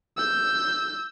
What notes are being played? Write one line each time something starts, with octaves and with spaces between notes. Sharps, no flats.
E6 G6